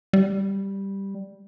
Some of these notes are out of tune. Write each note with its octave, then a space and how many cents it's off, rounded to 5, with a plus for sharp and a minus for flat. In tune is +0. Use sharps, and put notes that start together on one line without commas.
G3 +0